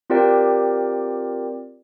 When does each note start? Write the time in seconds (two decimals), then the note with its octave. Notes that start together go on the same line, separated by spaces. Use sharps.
0.10 C4 F4 G4 A#4 D5 G5